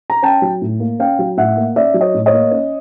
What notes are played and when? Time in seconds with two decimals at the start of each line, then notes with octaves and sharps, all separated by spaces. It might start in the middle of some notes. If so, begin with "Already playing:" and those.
0.10 A#5
0.22 C#4 G5 A5
0.42 F#3
0.62 A2
0.80 A#3
0.99 C#4 F5 G5
1.19 F#3
1.37 A2 E5 F#5
1.57 A#3
1.76 C#4 D5 E5
1.94 F#3
2.01 C#5 D#5
2.14 A2
2.26 C#5 D#5
2.33 A#3
2.51 C#4